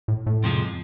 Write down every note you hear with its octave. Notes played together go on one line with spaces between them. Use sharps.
A2
A2
F2 C3 F3 G#3